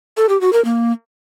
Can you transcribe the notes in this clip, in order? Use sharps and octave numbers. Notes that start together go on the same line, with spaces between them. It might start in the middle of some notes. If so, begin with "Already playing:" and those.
A4
G4
F#4
A#4
A#3